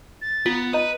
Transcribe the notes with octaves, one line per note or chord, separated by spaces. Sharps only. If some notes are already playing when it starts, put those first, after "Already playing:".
A6
B3 F4
D#4 B4 D#6 D#7